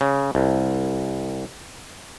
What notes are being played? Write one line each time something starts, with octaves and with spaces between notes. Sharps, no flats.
C#3
C2